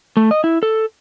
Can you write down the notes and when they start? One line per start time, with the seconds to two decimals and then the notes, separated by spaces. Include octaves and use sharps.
0.17 A3
0.31 D#5
0.44 E4
0.63 A4